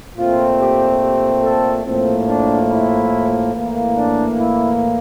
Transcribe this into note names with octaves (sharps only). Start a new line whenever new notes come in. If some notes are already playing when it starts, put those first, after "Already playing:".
A#2 A3 C4 F4
G4
G4
A4
A2 F3 A#3 C4
D4
E4
A2 E3 A#3
D4
E4